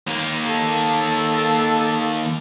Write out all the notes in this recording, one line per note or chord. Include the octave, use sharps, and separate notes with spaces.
D#2 A#3
A4